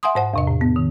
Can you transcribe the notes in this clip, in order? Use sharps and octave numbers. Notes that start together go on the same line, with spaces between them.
E5 F#5 G#5 C6 D#6
G#2 C5 F#5
E2 C3 D#5
A2
B3
D#3